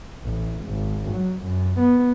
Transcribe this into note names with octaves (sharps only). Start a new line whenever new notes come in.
A1
G#1
F#3
F#2
B3